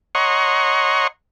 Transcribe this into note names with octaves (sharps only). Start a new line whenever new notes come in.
C#5 D#5 F#5 A#5 C6 C#6